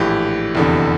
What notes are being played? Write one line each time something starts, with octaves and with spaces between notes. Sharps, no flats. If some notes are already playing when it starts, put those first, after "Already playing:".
Already playing: A#1 A2 E3 G4
F1 E2 D3